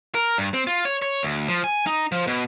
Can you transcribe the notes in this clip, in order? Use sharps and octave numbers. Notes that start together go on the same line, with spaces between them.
A#4
G2
C4
F4
C#5
C#5
D2
F3
G#5
D#4
F3
B2